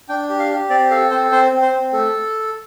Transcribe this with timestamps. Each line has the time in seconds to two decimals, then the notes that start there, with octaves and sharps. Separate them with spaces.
0.09 D4 G5
0.29 G4
0.39 F5
0.50 G4
0.70 C4 D5
0.91 A4 F5
1.11 C4 C5
1.31 C4 C5
1.52 C4
1.62 C5
1.72 C4
1.93 A3 A4